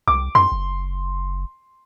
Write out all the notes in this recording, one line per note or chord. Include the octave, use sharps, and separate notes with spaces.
C2 D6
F#2 C6
F#1